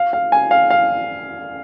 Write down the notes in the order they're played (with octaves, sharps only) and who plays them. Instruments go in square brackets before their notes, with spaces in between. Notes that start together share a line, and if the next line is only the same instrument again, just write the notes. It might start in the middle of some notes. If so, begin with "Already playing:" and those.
Already playing: [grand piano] F5
F5
G#5
F5
F5